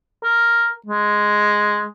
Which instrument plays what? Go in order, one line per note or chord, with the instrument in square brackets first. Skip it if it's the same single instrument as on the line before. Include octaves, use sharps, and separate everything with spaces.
[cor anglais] A#4
G#3